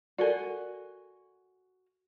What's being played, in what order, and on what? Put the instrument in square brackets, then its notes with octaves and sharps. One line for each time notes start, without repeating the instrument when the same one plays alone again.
[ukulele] F#4 G#5 [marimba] A4 A#4 D5